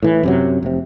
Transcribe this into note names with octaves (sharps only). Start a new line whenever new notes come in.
A2 E3
F#2 C3 F#3
F1 C3